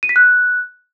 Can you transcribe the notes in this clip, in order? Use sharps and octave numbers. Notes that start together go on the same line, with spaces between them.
D#7
B6
F#6